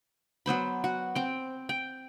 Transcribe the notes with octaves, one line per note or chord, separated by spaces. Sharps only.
F#3 B3 C5 B5
F#4
C4 G5
G5